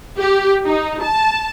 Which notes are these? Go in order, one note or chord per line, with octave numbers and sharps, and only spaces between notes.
G4
D#4
A5